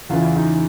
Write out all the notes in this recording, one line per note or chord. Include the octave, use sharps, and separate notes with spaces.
E2 C#3 E3 F4
E4
D#4 F4